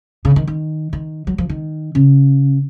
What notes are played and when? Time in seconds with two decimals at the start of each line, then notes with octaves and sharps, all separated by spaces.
0.25 C#3
0.36 D#3
0.47 D#3
0.93 D#3
1.27 F#3
1.38 F3
1.49 D#3
1.95 C#3